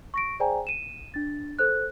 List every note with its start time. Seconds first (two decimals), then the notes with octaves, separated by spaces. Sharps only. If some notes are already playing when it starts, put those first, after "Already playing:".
0.14 C#6 A#6 D7
0.40 G#4 C5 D5 G5 G#5 A#5
0.67 D#7 E7
1.14 D4 A6
1.59 A4 C5 F#6